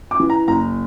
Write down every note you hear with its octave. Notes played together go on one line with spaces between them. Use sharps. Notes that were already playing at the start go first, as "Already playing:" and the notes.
D6
E3
A#5
F#1 A#5